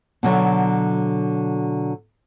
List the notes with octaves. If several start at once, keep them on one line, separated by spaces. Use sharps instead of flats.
B2 D3 F#3